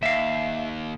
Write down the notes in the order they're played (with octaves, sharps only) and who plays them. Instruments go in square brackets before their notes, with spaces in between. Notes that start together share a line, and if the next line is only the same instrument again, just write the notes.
[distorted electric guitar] D#2 [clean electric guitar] E5 F5